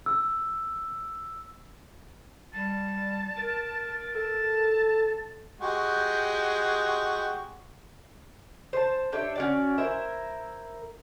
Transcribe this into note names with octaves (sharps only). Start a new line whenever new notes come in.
E6
G3 A5
A#4 A6
A4 A5
G#3 F#4 G4
C5 A5
D4 G4 C#5 E5
C#4 F#4 D5
E4 A#4 C5 E5